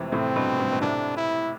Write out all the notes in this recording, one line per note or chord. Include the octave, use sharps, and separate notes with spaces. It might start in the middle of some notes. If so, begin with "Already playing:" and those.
Already playing: F2 A2 C3 E3
A2 C3 C4
G2 B2
G2 B2
B2
A2 C3 D4
E4